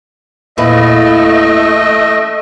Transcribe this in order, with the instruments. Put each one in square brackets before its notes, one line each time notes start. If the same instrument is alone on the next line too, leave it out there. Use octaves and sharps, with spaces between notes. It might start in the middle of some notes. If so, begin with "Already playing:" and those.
[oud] E2 A#2 B4 [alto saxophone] A3 [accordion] D#5